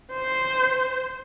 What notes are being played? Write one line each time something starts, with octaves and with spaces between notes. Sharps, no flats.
C5